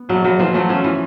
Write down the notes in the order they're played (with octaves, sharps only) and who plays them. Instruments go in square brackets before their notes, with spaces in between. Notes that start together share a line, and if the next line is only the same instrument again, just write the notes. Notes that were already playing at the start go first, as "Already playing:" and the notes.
Already playing: [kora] B3
[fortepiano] A#1 [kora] F#3
[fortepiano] A#1 [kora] F#3
[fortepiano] E3 [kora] F3
[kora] F#3 [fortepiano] A3
[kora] F3 [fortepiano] C#4
[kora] E3